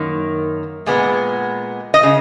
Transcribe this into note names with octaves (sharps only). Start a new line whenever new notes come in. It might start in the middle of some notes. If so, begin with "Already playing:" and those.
Already playing: F#2 D#3 A#3
A#2 G#3 B3
D#5
C#3